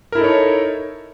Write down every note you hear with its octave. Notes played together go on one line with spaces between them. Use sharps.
D#4 E4 A4 A#4 C#5